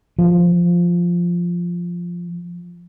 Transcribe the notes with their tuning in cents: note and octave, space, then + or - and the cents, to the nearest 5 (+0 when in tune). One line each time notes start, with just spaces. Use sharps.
F3 +0